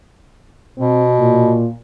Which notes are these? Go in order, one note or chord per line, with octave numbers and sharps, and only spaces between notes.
B2 C4
A#2